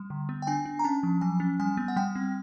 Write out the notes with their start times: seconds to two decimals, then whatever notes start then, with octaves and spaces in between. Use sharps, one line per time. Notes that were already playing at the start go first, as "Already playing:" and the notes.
Already playing: G3
0.10 D3
0.29 B3
0.42 G5
0.47 D4 G#5
0.66 D4
0.79 A#5
0.84 C#4 A5
1.03 F3
1.21 F#3 G#5
1.40 C#4
1.60 G3 G#5
1.77 B3
1.88 F#5
1.96 G3 G5
2.16 C4